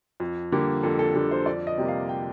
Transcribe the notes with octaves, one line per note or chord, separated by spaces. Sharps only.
F2
D3 G3 A#3
F2 A4
A4
D3 G3 A#3
C5
F2 D5
D#5
C3 G3 A#3
F5
G5